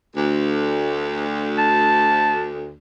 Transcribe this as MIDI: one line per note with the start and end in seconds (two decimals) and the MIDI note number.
0.15 2.74 38
1.58 2.45 81